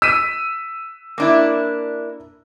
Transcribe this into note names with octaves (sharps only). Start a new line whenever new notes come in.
E6 B6 D#7
A#3 D4 E4